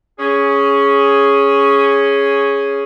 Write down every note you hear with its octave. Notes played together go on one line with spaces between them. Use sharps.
C#4 G#4